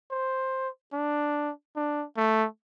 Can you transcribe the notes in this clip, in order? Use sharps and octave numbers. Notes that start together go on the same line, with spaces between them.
C5
D4
D4
A3